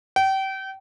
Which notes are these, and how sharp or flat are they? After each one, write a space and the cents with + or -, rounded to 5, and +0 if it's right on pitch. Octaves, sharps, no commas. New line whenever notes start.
G5 -30